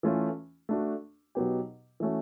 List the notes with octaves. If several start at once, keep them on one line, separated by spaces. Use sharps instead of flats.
E3 A3 C#4 F4 A4
A3 D4 F#4
B2 F#3 B3 D#4 G4
E3 A3 C#4 F#4